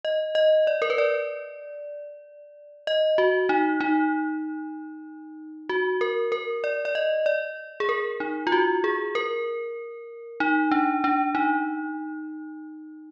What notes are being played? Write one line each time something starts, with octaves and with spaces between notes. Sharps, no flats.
D#5
D#5
D5
A#4
B4
D5
D#5
F#4
D#4
D#4
F#4
A#4
A#4
D5
D5
D#5
D5
G#4
A#4
D#4
F4
F#4
G#4
A#4
D#4
D4
D4
D#4